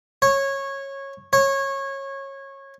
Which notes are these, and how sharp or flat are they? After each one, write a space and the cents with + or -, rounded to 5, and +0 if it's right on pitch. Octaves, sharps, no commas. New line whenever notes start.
C#5 -15
C#5 -20